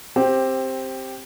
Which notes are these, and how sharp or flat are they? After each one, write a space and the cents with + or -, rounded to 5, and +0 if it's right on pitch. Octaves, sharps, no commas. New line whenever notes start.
C4 +10 G4 +0